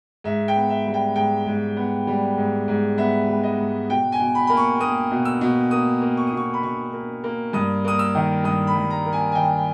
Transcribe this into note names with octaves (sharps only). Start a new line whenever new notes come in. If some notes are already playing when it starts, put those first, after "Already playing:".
G#2 E5
G5
B3
E5
G3
G5
G#2 G5
G#2
B3
G3
G#2
G#2
B3 E5
G3
D#5
G#2
B2 G5
G#5
B2
B5
A#3 B5
C#6
A#3 D#6
B2
E6
B2
A#3 D#6
A#3
C#6
D#6
B2 C#6
B5
B2 C#6
A#3
A#3
G2 D#6
A#3 D#6
E6
D#3
G2 D#6
B5
G2
A#5
A#3
G#5
G#5
D#3 G5